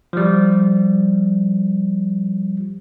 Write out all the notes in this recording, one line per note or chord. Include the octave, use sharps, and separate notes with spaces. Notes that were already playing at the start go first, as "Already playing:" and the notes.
F3 G3